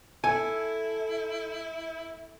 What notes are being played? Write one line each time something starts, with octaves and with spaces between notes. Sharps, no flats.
E4 A4 G#5